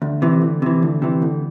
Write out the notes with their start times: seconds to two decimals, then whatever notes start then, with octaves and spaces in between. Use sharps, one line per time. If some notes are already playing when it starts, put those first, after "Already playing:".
0.02 D2
0.22 C3 E3
0.42 D2
0.62 C3 E3
0.82 D2
1.02 C3 E3
1.22 D2